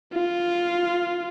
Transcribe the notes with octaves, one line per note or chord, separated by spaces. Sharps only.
F4